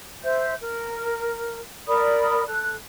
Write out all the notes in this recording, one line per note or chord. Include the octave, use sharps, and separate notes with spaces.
C5 E5 G6
A#4
A#4 D5 B5 D#6
A4 F#6